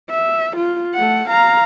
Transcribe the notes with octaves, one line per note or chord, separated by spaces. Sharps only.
E5
F4
A3 F#5
F5 A#5